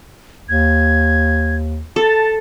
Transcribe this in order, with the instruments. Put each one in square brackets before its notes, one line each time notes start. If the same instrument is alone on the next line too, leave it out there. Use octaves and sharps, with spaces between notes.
[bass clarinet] D#2 [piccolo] G#6
[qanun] A4 [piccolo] A5